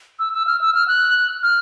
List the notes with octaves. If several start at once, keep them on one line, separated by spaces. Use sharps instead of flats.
E6
E6
F6
E6
F6
F#6
F6